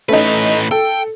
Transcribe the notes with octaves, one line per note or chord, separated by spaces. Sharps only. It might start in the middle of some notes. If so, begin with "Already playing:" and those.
A2 A3 C#4 D#4 B4
A4 G5